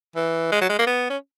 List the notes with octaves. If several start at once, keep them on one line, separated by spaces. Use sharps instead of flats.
E3
G#3
F#3
G#3
A#3
B3
C#4